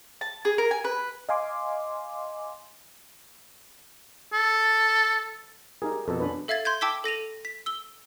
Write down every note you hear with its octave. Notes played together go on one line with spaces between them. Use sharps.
A5
G#4
A#4
G#5
B4
D#5 F5 G#5 C6 D6
A4
D#4 G4 G#4 A#4
F2 B2 A4
C#4 D4 B4
A4 E5 F5 G#6 A6
C6 G6 G#6
G5 A5 D6 E6 B6 G7
A4 A#6 D#7 F7
B6
E6 G7